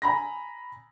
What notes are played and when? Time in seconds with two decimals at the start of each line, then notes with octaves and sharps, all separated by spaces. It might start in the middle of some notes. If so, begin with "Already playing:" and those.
0.02 G#5 A#5 B5 A#6